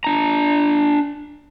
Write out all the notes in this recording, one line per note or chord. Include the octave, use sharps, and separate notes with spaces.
D4 A#5